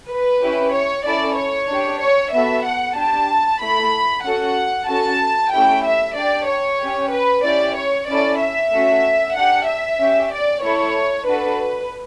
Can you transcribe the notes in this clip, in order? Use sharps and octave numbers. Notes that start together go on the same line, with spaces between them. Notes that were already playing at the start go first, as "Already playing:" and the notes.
B4
C#4 E4 G4
C#5
C#4 E4 A4 D5
C#5
D4 G4
C#5
B3 F#4 A4 E5
F#5
D4 G4 A5
A3 E4 A4 B5
C#4 F#4 A4 F#5
C#4 F#4 A4 A5
A3 C#4 E4 G4 G5
E5
D4 G4 D5
C#5
C#4 G4
B4
C#4 E4 G4 D5
C#5
C#4 E4 A4 D5
E5
A3 C#4 F#4
D4 G4 F#5
E5
C#4 G4
D5
A3 E4 A4 C#5
D4 F#4 A4 B4